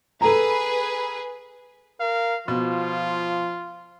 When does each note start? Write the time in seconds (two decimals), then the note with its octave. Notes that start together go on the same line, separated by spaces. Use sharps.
0.21 G#4 A4 B4 A#5
2.00 A#4 F5
2.48 B2 F3 F4